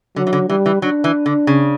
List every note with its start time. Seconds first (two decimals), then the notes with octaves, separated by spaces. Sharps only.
0.16 D3 F#3
0.27 E3
0.33 D3
0.49 E3 G3
0.66 E3
0.82 F#3 D4
1.04 E3
1.26 D3
1.47 C#3